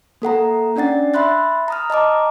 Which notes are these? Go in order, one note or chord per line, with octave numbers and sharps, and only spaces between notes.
A#3 A4 F#5 A#5
C#4 D4 D5 F#5 A6
E5 B5 C6 F#6 A6
A#5 D#6 F6
D#5 A5 A#5 D6